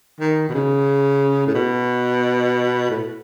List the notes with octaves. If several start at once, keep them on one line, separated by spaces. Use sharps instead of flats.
D#3
B2
C#3
A2
B2
A2